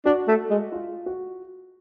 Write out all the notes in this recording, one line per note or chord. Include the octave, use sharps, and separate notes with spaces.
D4 F#4
A3
G#3
F4
F#4